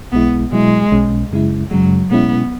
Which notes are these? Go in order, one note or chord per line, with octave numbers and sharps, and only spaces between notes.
B1 B2 G#3 B3 E4
B2 F#3 G#3 E4
B1 B2 G#3 C#4
F#2 C#3 G#3 E4
F#2 C#3 F#3 G#3
B2 G#3 B3 C#4 E4